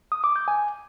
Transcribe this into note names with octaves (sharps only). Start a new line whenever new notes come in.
D#6
D6
G6
G#5